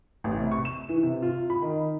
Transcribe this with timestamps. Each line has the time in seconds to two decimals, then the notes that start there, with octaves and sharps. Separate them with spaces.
0.24 A1
0.39 C3
0.52 C#6
0.65 E7
0.89 E3
1.03 C3
1.22 F4
1.50 B5
1.62 D#3